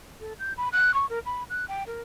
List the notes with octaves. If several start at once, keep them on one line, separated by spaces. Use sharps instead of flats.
A4
G6
B5
F#6
C#6
A#4
B5
F#6
G5
A#4